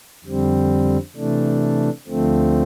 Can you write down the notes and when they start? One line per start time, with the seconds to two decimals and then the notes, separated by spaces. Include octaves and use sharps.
0.24 F2 D3 G3 C4
1.15 C3 E3 A3 D4
2.08 D2 D3 F3 A3 C4